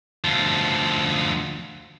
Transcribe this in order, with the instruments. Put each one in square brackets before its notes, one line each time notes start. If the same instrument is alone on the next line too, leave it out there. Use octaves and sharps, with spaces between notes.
[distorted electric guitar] D2 F3